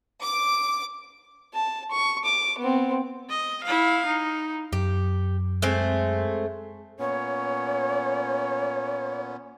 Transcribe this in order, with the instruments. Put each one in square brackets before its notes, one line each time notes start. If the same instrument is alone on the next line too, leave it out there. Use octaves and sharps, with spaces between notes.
[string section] D6
[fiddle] A5
C#6
D6
B3 C4
[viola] D#5
E4 F5
D#4
[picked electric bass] F#2 [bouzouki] G4
[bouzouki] G#3 A3 C4
[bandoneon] A#2 B3 C#4 [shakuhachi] C#5